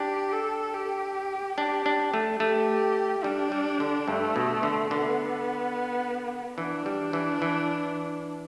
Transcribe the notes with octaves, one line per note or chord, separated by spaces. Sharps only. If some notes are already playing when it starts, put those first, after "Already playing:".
Already playing: D4 G4
A4
G4
D4 G4
D4
A3
A3 G4
G3 D4
G3
D3
G2 A3
B2
D3
D3 B3
E3 D4
G3
E3
E3